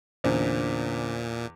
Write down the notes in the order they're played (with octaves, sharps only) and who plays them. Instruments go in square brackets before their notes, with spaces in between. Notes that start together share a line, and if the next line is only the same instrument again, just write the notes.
[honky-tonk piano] E2 [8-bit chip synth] A#2 [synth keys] D3 C#4 D4 [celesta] C5